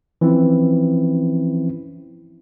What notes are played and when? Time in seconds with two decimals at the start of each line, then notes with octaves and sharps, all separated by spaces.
0.21 E3 F3 C4 C#4 E4